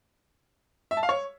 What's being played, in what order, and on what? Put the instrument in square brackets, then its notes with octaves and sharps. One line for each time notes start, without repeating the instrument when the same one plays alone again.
[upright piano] E5
A5
F5
C#5